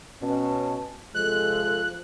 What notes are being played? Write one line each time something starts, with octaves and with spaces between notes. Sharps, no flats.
B2 C#4 A5
C3 F3 G#3 A4 F#6